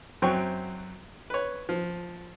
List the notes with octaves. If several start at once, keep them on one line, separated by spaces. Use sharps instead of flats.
F#2 F#3 C4 G5 C#6
B4 C#5
F3